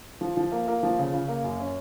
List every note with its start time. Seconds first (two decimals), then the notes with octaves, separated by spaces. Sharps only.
0.21 F3
0.37 F3
0.52 A#3
0.68 A#3
0.83 F3
0.99 C#3
1.14 C#3
1.28 A#3
1.44 F#2
1.60 C#4